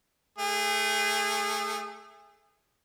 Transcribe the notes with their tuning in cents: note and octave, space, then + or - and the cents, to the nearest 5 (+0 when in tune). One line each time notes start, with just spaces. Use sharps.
A3 +0 G#4 -25